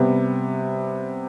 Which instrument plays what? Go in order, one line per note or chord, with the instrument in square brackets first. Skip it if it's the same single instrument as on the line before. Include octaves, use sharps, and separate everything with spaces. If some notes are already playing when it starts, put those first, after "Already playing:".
Already playing: [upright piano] C3 G3 B3